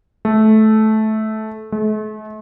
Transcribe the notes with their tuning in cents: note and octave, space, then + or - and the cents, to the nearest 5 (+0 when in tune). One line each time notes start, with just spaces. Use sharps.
A3 -15
A3 -45